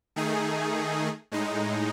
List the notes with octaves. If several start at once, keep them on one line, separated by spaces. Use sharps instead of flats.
D#3 A3 D#4 G#4
A2 G#3 D#4